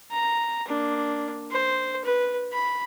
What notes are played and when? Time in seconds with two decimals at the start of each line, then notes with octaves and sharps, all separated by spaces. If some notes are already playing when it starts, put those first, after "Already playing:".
0.11 A#5
0.68 A#3 D4
1.51 C5
2.04 B4
2.52 B5